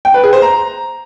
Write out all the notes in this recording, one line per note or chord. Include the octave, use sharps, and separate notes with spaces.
G5
B4
G#4
C5
A#5